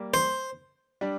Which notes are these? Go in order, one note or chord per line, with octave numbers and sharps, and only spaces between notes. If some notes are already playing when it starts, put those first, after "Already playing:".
Already playing: G3 A#3
C5
G3 D4